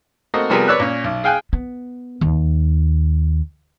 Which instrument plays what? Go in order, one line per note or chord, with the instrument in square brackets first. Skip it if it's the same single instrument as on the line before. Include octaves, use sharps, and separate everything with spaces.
[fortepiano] A3 A#3 C4 F#4 D#5
C3 F3 G3 B3 G#4 A#4
B4 C#5 D5 E6 F#6
A#2 C#4
B1
G#4 F5 G5 G#5 F#6
[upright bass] B3
D#2